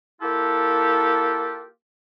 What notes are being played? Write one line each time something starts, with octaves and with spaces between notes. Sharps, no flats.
A#3 E4 F4 G4 A4